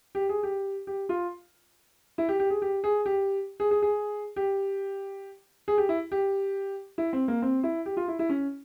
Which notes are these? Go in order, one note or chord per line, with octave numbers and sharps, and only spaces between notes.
G4
G#4
G4
G4
F4
E4
G4
G4
G#4
G4
G#4
G4
G#4
G#4
G#4
G4
G#4
G4
E4
G4
E4
C4
A#3
C4
E4
G4
F4
E4
E4
C#4